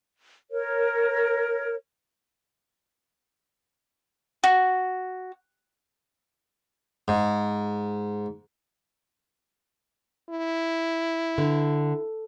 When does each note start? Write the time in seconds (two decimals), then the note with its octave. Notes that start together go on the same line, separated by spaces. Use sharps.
0.51 A#4 C#5
4.44 F#4
7.08 G#2
10.29 E4
11.38 D3